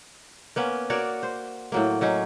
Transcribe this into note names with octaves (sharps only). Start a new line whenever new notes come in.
A#3 B3 C#4
F#4 A#4 C#5 D5
C5
A2 F#3 A#3
F#3 C#4 D#4